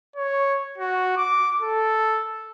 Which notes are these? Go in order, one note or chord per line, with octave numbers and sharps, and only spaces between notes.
C#5
F#4
D6
A4